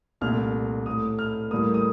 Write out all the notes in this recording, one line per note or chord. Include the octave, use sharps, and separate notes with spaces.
C2 A#2 A3 F6
A2 A3 D#6
F6
A2 G3 A#3 D#6
D#6